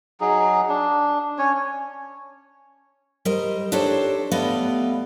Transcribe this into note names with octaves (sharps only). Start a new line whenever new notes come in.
F#3 D#4 G#4
D4
C#4 C#5
G3 A#4 C5 D#5
D4 D#4 G4 A4 C5 C#5
G3 A3 B3 B4 D#5 F5